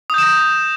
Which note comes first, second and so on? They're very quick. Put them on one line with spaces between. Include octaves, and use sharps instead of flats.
D#6 G6 E7 A#6